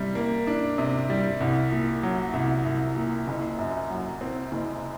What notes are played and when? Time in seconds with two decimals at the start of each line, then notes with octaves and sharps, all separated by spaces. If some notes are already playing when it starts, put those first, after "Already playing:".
Already playing: C3 G3
0.15 A#3
0.47 D4
0.78 C3
1.10 G3
1.41 C2
1.72 A#2
2.03 F#3
2.34 C2
2.65 C2
2.96 A#2
3.28 F#1
3.58 F#2
3.90 F#3
4.21 C4
4.52 F#1